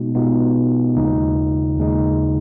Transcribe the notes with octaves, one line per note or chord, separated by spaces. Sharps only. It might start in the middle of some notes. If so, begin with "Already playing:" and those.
Already playing: B2 G#3 B3 D#4 F#4
B2 G#3 B3 D#4 F4
D#2 C#3 G#3 D#4
D#2 C#3 G#3 D#4